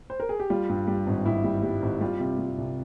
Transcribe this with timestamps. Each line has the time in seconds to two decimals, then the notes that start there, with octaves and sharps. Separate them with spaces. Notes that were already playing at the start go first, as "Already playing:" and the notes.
0.10 C5
0.20 A#4
0.29 G#4
0.40 G4
0.50 G3 F4
0.69 G2
0.87 G3
1.07 G#1
1.26 G#1 E4
1.44 G3
1.63 G3
1.82 G#1
2.01 G3 F4
2.20 C3
2.39 G3
2.58 C2